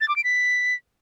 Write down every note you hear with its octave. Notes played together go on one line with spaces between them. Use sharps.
A6
D6
D7
B6